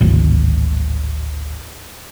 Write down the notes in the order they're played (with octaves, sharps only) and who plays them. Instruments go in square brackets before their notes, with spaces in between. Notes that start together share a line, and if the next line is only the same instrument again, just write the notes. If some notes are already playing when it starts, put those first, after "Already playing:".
[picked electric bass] D1 G#1